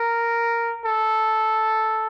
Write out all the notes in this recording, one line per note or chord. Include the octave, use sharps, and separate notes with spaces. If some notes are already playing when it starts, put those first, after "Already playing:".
Already playing: A#4
A4